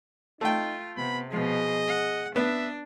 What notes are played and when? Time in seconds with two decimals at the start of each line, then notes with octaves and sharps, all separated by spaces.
0.41 A3 D#4 F4 G5
0.97 C3 B3 B5
1.31 B2 F3 G#4 D#5
1.88 F#5
2.36 B3 D4 E5